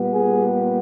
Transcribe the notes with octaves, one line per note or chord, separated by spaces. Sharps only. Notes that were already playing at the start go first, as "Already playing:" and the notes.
Already playing: A#2 G3 B3
G#4